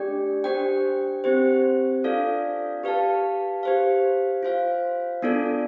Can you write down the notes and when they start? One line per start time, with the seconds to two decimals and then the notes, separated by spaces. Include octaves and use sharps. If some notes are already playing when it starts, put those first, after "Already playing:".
Already playing: A3 D4 G4 D5 G5
0.44 D4 G4 C5 G5
1.24 C4 G4 C5
2.04 D4 F4 A4 D5 F5
2.83 G4 B4 F5 A5
3.63 G4 C5 F5
4.43 F4 C5 F5
5.22 B3 D4 F4 A4 D5